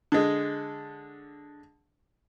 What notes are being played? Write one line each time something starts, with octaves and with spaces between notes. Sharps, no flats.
D3 G#3